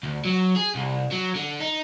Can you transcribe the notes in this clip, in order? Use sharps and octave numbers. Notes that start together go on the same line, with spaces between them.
D2
F#3
G#4
C2
F#3
D3
D#4